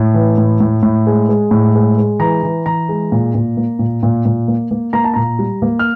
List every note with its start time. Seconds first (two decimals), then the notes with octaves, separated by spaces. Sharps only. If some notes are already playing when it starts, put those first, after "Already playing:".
Already playing: A2
0.14 E3
0.38 A2
0.60 A2
0.83 A2
1.07 G#3
1.29 G#3
1.51 A2
1.75 G#3
1.98 G#3
2.19 E3 A#5
2.43 E3
2.66 E3 A#5
2.89 G#3
3.12 A#2
3.35 A#2
3.57 A#3
3.79 A#2
4.03 A#2
4.25 A#2
4.48 A#3
4.71 A#3
4.93 A#3 A#5
5.04 A5
5.14 A#2 A#5
5.39 G3
5.62 A#3
5.79 F6